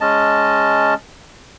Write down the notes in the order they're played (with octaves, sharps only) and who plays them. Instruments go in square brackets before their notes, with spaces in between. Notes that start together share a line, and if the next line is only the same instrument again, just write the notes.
[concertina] G#3 C#4 D#5 A5